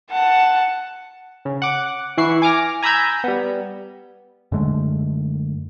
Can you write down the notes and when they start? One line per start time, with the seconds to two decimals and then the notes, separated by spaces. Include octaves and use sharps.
0.11 F#5 A5
1.45 C#3
1.62 F#5 D6
2.17 E3 E4 F#5 C#6 C7
2.42 G#5 D6 F6 A#6
2.82 G#5 A#5 B5 E6 G6 G#6
3.24 G3 B3
4.52 F#2 D3 G#3 A3